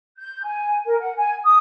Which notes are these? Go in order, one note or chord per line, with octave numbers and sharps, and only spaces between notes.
G6
G#5
A#4
F#5
G#5
D#6